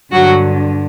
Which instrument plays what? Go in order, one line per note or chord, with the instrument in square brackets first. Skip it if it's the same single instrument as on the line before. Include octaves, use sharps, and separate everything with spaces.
[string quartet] G2 D3 F#3 F#4